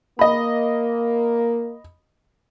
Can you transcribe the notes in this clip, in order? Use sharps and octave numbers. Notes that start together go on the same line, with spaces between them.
A#3 D#5 B5